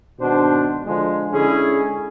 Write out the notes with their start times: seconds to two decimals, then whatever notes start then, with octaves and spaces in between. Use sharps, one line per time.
0.20 G#1 B2 D4 C5
0.85 D3 F3 G#3
1.32 D3 G#3 C#4 E4 G#4